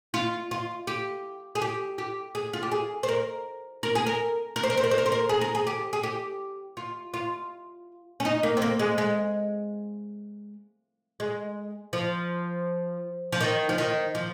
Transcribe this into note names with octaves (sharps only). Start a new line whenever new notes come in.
F4
F4
G4
G#4
G4
G4
G#4
F4
G4
G#4
C5
A#4
A#4
G#4
A#4
A#4
C5
A#4
C5
A#4
C5
A#4
C5
A#4
G#4
A#4
G#4
G4
G#4
G4
F4
F4
C#4
D#4
A#3
C4
A#3
G#3
G#3
G#3
F3
F3
D#3
F3
D#3
F3